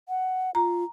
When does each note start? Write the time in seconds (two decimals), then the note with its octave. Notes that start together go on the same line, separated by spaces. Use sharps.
0.09 F#5
0.55 F4 A#5